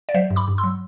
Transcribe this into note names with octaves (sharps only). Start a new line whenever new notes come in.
D5
F#3 C5 E5
G2
B5 D6
G2
C6 E6
F#3